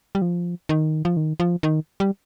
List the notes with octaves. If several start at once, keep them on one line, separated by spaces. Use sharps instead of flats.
G3
F3
D#3
F3
D#3
F3
D#3
G3